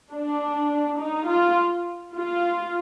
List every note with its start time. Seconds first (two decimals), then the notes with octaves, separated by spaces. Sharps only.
0.11 D4
0.98 D#4
1.28 F4
2.15 F4